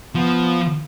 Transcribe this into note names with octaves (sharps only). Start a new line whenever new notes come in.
F3 B3